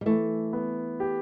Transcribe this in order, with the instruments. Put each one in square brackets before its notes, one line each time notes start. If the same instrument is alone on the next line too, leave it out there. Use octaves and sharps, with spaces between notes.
[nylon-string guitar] G3
[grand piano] E3 [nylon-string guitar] A3
[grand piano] B3
G4